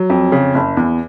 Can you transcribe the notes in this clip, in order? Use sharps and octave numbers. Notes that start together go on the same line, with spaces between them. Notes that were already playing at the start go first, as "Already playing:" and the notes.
Already playing: F#3
F2
C#3
F#1
E2